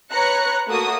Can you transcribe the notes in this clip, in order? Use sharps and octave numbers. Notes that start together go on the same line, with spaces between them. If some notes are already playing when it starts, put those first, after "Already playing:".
B4 C#5 A#5 F#6 C#7
A3 A#3 F#4 D#6